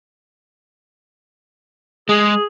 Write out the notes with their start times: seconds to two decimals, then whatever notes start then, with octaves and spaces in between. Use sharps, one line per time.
2.09 G#3 G#4